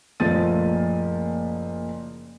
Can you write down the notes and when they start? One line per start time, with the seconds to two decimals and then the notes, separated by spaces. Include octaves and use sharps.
0.20 F#1 A#2 F3 A3 A6 D#7